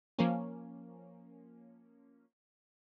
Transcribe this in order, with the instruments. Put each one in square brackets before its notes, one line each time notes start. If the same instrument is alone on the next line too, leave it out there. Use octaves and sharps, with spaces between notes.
[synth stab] F3 A#3 C#4